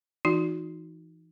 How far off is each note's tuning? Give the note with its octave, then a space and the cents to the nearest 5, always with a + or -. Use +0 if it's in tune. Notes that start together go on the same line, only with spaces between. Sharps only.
E3 +15 D#4 +0 F#4 -25